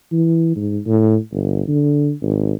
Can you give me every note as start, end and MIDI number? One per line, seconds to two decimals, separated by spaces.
0.12 0.54 52
0.56 0.79 44
0.87 1.17 45
1.32 1.62 31
1.68 2.12 50
2.22 2.53 32